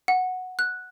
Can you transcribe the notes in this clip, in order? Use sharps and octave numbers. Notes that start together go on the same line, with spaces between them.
F#5
F#6